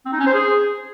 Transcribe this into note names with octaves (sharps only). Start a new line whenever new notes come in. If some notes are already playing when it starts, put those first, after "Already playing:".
C4
D#4
C#4
C5
G#4